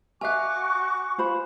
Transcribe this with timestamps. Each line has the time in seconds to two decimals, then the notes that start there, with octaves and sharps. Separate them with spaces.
0.21 F#4 A#4 E5 F5 G#5 C#6 D6 F#6
1.18 F4 C5 B5